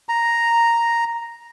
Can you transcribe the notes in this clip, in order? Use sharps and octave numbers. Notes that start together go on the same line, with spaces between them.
A#5